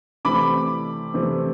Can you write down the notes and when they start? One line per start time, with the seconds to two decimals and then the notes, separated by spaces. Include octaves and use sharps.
0.25 C3 E3 A3 C4 B5 D6
1.14 C3 E3 A3 C4